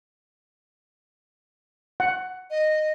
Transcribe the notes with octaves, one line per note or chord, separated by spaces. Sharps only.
F#5
D#5